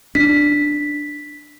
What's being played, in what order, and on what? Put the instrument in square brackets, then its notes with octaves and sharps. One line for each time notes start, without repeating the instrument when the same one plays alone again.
[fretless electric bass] D4 [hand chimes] B6